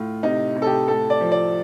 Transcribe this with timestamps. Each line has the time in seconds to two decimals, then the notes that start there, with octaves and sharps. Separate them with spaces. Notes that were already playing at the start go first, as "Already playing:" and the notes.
Already playing: A2 F4
0.23 C3 D#4
0.56 C3
0.62 A4
0.66 G4
0.88 A2 A4
1.10 D5
1.21 F3
1.32 D5